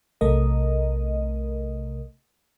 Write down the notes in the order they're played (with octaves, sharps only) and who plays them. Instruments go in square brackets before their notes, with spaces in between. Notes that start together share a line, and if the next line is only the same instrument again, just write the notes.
[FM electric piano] B1 C3 A3 A#4 D#5